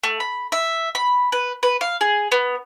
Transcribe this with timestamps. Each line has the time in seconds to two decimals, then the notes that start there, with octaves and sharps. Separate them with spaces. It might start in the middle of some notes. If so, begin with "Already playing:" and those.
0.03 A3
0.20 B5
0.52 E5
0.95 B5
1.32 B4
1.63 B4
1.81 F5
2.01 G#4
2.32 B3